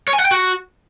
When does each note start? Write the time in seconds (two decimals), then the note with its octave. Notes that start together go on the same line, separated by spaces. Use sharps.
0.08 C#5
0.13 G#5
0.19 F#5
0.25 G5
0.31 F#4